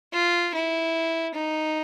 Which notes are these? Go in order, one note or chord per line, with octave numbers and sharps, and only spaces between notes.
F4
E4
D#4